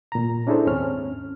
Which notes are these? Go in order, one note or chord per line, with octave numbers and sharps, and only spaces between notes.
A#2 A#5
C#4 D4 E4 G#4 A4 C5
D#2 G#2 C4 C#4 F6